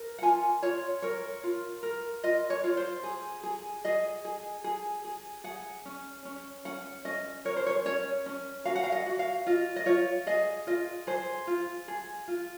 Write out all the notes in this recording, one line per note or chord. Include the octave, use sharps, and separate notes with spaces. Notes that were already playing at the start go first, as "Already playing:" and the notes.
Already playing: A#4
F#5
F4 G#5
F4 C#5
A#4 C#5
F4
A#4
F4 D#5
C#5
F4
C5
G#4
G#4
G#4 D#5
G#4
G#4
G#4
G#4 F#5
C#4
C#4
C#4 F#5
C#4 D#5
A#4 C#5
C5
C#5
C#4 C#5
C#4
F#4 F5
F#5
F5
D#5
F#4
F5
F4 D#5
D#5
F4 C#5
G#4 D#5
F4 D#5
G#4 C5
F4
G#4
F4